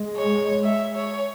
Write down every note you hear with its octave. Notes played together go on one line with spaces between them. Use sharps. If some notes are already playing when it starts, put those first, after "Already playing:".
Already playing: G#3
C#5
E5
C#5